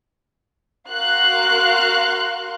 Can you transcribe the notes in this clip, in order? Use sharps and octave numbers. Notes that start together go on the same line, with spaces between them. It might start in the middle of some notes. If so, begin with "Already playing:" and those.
F#4 A#4 F5 C6 F#6